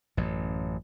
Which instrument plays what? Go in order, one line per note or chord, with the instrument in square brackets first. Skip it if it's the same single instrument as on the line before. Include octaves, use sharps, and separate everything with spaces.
[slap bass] A1 F#2